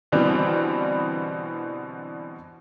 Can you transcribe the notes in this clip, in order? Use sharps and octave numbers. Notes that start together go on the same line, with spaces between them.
B2 D3 E3 G3 B3 C4